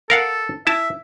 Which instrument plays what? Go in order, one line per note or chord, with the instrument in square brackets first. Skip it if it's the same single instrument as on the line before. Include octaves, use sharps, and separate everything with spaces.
[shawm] A4 [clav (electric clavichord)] A#4 F5 F#5
[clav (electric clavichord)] E4 A5 [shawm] E5